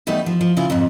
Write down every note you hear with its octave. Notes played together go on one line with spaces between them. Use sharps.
E2 G3 A3 B3 D#4
F3
F3
C#3 E4 F4
F2 G#2 F3